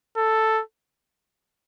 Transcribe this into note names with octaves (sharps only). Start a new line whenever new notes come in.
A4